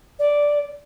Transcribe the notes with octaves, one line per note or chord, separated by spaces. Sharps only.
D5